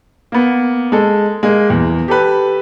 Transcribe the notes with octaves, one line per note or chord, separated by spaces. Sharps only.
A#3 B3
G#3 A4
G#3 A#3
E2
G4 A4 B4